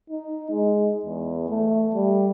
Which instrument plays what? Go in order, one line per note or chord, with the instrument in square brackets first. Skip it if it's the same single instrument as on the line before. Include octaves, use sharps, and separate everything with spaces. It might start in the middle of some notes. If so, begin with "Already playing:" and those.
[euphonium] D#4
G#3
E2
A3
G3